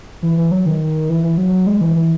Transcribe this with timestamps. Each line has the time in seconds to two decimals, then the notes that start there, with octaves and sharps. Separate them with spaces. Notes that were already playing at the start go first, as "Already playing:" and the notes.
0.22 E3
0.37 E3
0.51 F#3
0.66 D#3
1.09 E3
1.23 E3
1.38 F#3
1.67 G#3
1.81 E3
1.96 E3